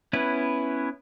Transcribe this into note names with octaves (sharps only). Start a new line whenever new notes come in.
B3 C#4 E4 B4